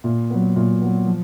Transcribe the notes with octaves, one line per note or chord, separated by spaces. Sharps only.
A#2
F#3 B3
A#2
F#3 B3
F3